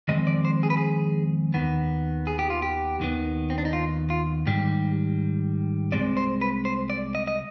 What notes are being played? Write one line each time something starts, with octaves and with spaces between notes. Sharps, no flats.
F2 D#3 G#3 C4 D#5
D5
C5
G#4
B4
G#4
D#2 D#3 B3
G#4
G4
F4
G4
D#2 D#3 B3
C4
D4
D#4
F4
F4
G#2 D#3 G3 G4
C2 B2 G#3 C4 D5
C5
B4
C5
D5
D#5
D#5